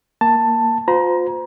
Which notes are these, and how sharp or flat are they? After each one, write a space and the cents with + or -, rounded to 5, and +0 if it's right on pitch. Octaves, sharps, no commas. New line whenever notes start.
A#3 +0 A5 +10
F4 +35 C5 -30 A#5 +25